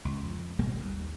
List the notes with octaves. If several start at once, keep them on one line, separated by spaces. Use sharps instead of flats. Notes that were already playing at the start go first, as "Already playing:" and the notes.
C#2
F2
G#1 B2 G3 A#3
D#2